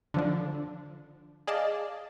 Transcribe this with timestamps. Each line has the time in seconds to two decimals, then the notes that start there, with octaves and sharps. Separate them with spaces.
0.14 D3 F3 D4
1.47 G#4 D5 D#5 F5 A5